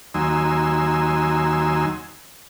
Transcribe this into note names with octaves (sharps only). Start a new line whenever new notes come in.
D#2 F#3 D#4 G#5 C6 E6